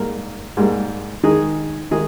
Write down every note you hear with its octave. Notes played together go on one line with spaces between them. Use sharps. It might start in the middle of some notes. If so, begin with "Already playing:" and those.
Already playing: G#2 G3 A#3
G#2 G3 A#3
D#3 G#3 D#4 G#4
D#3 G#3 D#4 G#4